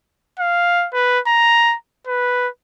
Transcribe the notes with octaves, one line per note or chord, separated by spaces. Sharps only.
F5
B4
A#5
B4